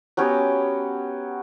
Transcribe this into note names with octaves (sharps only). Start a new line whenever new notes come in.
F#3 B3 C#4 G4